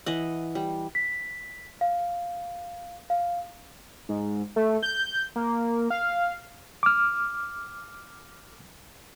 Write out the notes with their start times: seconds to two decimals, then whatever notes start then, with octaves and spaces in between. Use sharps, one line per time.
0.06 E3 D#5 F#5
0.55 G3
0.95 B6
1.81 F5
3.10 F5
4.09 G#2
4.56 A3
4.83 G6
5.36 A#3
5.90 F5
6.83 D6 F6